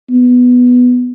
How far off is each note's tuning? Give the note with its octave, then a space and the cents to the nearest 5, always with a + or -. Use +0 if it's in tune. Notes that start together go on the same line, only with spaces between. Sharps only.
B3 +0